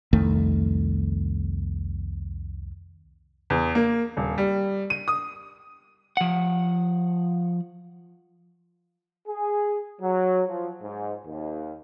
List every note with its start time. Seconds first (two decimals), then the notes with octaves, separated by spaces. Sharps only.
0.13 C2 F2 D#3 A3
3.50 E2
3.75 A#3
4.17 D#1
4.38 G3
4.90 D#7
5.08 D#6
6.17 F3 F#5
9.28 G#4
10.02 F#3
10.48 F3
10.82 G#2
11.26 D#2